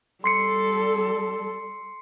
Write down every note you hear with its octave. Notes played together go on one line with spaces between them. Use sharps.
G3 A4 C6 C7 C#7